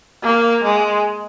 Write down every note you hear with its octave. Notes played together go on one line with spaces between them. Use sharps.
A#3
G#3